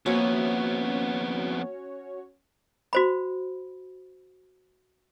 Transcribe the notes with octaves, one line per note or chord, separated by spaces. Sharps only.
F2 A#3 B3 C#4 F#4 C5 C#5 E5
F#4 C5 B5